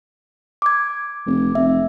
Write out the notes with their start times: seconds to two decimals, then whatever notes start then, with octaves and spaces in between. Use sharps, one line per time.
0.62 D6 G#6
1.27 F1
1.55 F1 E5